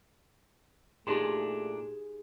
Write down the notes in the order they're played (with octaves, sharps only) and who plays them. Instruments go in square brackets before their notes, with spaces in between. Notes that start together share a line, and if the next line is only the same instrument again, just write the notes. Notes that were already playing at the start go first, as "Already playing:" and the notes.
[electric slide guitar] A#2 D4 D#5 [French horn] A3 [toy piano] D#4 G4 C6 [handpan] G#4